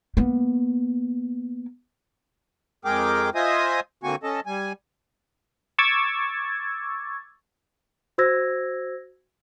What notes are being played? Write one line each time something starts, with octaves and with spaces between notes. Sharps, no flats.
A#3 B3
F2 G#3 G#4 A#4 G5 D6
F4 C5 D#5 E5 G#5 D#6
D3 A#3 C4 F#4 G#5 C#6
C#4 A4 D#5 A5
G3 G#5
C#6 D6 E6 G#6 A6
F#4 C5 E6 G#6 A#6